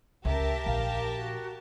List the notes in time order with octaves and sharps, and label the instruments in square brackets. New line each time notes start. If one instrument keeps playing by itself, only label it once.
[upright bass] C#2 [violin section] G4 A#4 A5 [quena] E5
[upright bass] A#1 [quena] F5
[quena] F#4